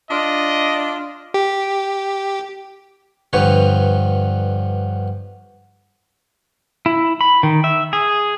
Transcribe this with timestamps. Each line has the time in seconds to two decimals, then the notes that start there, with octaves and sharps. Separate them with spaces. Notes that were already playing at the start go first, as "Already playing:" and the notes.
0.10 D4 F4 D#5
1.34 G4
3.33 G2 D3 F3 B4 C#5
6.86 E4
7.21 B5
7.43 D#3
7.64 E5
7.93 G#4